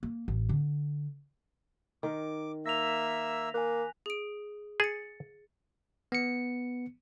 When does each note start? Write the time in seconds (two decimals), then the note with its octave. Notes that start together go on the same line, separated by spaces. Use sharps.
0.03 A#3
0.28 A1
0.49 D3
2.03 D#3 A#4 D6
2.66 A#3 E5 E6 A#6 B6 F7
3.54 A#3 G#5 F#6
4.06 G#4 D7
4.80 G#4 A6 C#7
6.12 B3 C#7